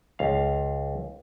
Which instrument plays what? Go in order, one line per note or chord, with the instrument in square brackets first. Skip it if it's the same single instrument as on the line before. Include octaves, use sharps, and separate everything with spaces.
[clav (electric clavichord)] C#2 F5